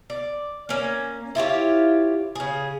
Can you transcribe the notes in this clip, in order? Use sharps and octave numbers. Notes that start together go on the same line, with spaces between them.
D5
A#3 C#4
E4 F4 G4 C#5
C#3 G#4